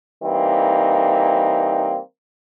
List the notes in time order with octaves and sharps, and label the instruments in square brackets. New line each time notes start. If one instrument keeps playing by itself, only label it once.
[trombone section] E3 G3 A#3 C4 D#4